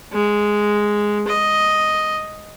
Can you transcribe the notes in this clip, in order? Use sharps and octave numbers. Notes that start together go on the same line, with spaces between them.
G#3
D#5